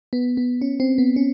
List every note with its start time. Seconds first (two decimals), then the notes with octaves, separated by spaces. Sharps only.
0.13 B3
0.37 B3
0.61 C#4
0.80 C4
0.98 B3
1.16 C#4